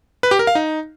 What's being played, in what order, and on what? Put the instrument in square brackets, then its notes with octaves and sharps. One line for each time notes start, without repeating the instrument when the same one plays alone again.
[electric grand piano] B4
G4
A#4
F5
D#4